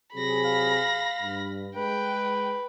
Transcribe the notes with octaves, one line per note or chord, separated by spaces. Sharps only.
C3 F#3 G#4 B5 A#6
F5
G2
G#3 B4 G5